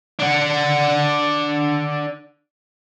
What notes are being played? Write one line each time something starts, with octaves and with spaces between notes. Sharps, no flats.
D4 F#5